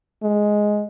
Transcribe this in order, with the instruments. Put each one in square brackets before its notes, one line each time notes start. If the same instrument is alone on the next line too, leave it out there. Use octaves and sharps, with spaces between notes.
[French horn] G#3